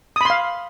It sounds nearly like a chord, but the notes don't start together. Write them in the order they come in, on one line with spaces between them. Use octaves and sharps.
D#6 B5 C6 F5